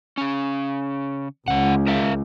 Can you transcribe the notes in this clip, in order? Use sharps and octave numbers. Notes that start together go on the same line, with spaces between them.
C#3 C#4
C#2 C#3 F#5
A#4 E5 F5